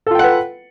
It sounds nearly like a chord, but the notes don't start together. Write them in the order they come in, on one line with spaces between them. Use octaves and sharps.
A4 F4 G5 F#5 B4